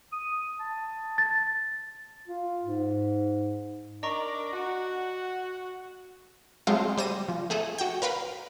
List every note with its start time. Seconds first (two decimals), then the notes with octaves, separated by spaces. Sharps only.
0.12 D#6
0.60 A5
1.18 A6
2.28 F4
2.62 G#2
4.03 D4 A#4 D5 D#5 A#5 C#6
4.53 F#4 F#5
6.67 F#3 G#3 A3 C4 F4
6.98 G3 C5 A#6 D#7
7.29 F3
7.50 A3 G#4 A4
7.78 F#4 G5
8.02 A#4 B4 F5 B5